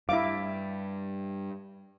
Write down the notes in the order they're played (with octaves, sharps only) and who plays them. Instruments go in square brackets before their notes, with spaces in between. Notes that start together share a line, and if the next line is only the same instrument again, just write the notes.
[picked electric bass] G2 [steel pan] E4 D6 [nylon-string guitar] E5 F5